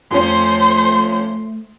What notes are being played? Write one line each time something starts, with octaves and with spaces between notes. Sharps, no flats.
F2 F3 A3 C#4 C5 C6